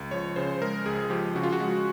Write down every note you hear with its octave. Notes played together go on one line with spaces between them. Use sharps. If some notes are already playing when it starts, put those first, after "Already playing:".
Already playing: C#2
F3 C#5
C#3 C5
G#3 A#4
C#2 G#4
F3 G4
C#3 F#4
F4
F#4
G#3